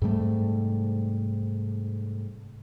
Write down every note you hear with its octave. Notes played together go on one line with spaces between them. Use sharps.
G#2 C3 G3 A3